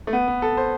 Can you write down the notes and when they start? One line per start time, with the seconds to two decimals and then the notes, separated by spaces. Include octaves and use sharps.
0.07 A3
0.13 B3
0.28 B3
0.42 A4
0.57 C5